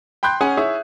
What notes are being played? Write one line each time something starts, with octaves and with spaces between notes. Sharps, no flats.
G5 B5 C6 F#6 G6
C#4 G#4 F#5 G#5
E4 G#4 C#5 E5